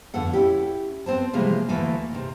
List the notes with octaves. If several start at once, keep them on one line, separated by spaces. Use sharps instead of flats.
F2 D3 B3 A4 F#5
C#4 E4 G4
B3 C4 C5 A5
C3 E3 F3 G3 G#3 A#3
D2 E3 A3 A#3 F5 G#5
C3 D#3